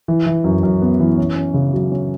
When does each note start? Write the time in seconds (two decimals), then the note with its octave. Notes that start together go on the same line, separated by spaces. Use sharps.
0.08 E3
0.26 E3
0.44 F#2
0.63 F#2
0.82 B3
1.00 E3
1.18 C#4
1.36 C#4
1.54 C#3
1.74 F#3
1.92 C#4